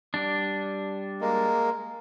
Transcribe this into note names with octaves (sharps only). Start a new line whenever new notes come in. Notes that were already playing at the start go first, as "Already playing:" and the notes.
G3 D4
G#3 A#3